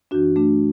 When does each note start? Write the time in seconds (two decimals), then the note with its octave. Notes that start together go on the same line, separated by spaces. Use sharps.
0.11 F#2 E3 D4 F#4
0.36 A3 D4